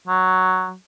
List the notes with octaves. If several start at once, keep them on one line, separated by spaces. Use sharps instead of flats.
F#3